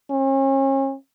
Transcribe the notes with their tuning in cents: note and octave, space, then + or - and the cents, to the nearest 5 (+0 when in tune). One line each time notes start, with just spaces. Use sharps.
C#4 -40